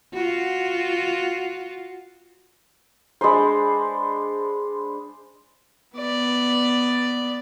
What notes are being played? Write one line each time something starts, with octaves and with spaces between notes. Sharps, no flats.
F4 F#4
G#3 D4 B4 C5
B3 D5